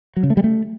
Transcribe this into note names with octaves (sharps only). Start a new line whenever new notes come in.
F#3
C#3
A3
G3
A3